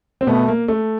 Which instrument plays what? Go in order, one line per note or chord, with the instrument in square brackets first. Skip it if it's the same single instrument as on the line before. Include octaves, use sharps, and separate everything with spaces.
[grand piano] C4
[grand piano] B2 B3 [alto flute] A3
[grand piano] A#3
A3